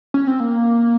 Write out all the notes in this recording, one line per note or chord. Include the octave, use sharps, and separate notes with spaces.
C#4
C4
A#3